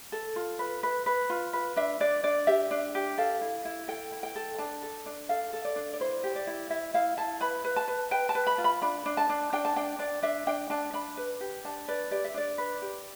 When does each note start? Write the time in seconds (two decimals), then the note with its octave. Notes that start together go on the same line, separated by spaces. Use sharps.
0.12 A4
0.36 F4
0.59 B4
0.83 B4
1.06 B4
1.30 F4
1.53 B4
1.77 D4 E5
2.00 D4 D5
2.24 D4 D5
2.47 G4 E5
2.71 D4
2.95 G4
3.18 A4 F5
3.41 E4
3.65 E4
3.88 A4 G5
4.12 E4
4.23 G5
4.36 A4
4.58 D4 A5
4.82 A4
5.06 D4
5.29 A4 F5
5.53 A4
5.65 D5
5.76 D4
5.93 D5
6.00 E4 C5
6.24 G4
6.36 D5
6.47 E4
6.70 E4 E5
6.94 E4 F5
7.17 E4 A5
7.41 B4 B5
7.64 B4
7.76 A5
7.88 B4
8.11 B4 G5
8.29 A5
8.35 B4
8.47 B5
8.58 F4
8.64 B5
8.82 D4 B5
9.06 D4
9.17 A5
9.29 D4
9.53 D4 G5
9.65 A5
9.76 D4 G5
9.99 D4 D5
10.23 D4 E5
10.47 D4 G5
10.70 D4 A5
10.93 D4 B5
11.17 B4
11.41 G4
11.65 D4 A5
11.88 B4 D5
12.11 G4 D5
12.25 E5
12.34 D4 D5
12.58 B4
12.82 G4